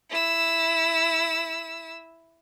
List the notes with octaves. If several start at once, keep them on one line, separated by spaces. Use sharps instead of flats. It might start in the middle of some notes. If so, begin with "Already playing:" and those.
E4 E6